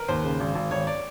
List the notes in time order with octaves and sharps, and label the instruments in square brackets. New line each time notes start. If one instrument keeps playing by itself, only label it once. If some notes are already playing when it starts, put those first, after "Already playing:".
Already playing: [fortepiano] A#4 B4
[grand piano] D#2 [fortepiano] C5
[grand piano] C#3
G#1
G#1
[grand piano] G#1 [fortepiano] C#5
[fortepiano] D5